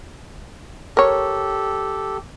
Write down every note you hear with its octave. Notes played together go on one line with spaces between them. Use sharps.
G4 A4 A#4 C#5